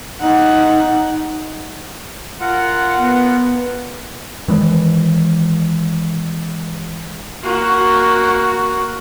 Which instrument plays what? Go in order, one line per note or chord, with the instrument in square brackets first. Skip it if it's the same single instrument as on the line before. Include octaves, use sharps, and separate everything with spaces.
[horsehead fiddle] D#4 F#5
[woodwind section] F4 A#4 F#5
[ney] B3
[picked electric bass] D#3 E3 G#3
[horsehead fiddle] A#3 F#4